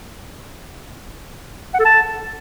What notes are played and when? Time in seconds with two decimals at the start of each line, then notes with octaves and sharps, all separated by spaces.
1.74 F#5
1.80 A4
1.85 A5